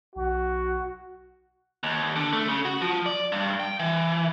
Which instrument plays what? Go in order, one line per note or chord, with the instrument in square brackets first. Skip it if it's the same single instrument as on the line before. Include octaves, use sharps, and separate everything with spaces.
[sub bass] B1 [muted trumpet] F#4
[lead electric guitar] D#2
D3
A3
C#3
F#4
F3
D5
G2
G5
E3